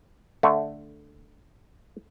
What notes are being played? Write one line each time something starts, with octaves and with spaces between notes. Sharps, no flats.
D3 A3